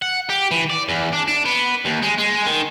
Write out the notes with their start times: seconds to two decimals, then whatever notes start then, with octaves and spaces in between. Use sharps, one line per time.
0.02 F#5
0.29 G4
0.51 E3
0.70 D5
0.88 E2
1.13 D4
1.28 D4
1.46 B3
1.85 D#2
2.03 G#3
2.18 G#3
2.46 D#3